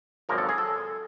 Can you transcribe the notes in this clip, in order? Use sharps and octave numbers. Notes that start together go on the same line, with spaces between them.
G#1 F#2 C#3 F3 A#3 A#4
A4
G#4
A4